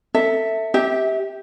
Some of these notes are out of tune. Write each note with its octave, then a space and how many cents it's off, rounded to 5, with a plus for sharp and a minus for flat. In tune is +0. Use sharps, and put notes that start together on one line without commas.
A4 +25 E5 -5
G4 +0 E5 -30